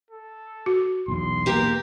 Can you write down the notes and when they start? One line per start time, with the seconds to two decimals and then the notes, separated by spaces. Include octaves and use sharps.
0.11 A4
0.66 F#4
1.08 B1 E2 C6
1.46 A#3 G4 A#4